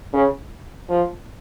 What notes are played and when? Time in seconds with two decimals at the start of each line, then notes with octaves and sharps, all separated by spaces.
0.13 C#3
0.89 F3